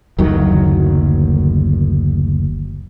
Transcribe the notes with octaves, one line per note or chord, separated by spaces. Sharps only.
F#1 D2 D#3 F#3